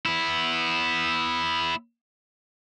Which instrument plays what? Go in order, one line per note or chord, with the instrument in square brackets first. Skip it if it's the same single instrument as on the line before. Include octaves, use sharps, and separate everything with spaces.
[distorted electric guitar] B3 E4